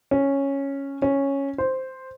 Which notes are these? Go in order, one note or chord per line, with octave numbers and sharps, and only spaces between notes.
C#4
C#4
C5